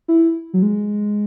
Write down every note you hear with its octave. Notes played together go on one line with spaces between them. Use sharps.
E4
F#3
G#3